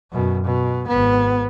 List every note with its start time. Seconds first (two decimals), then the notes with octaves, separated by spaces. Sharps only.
0.12 F#2 B2
0.44 B2
0.87 G#1 B3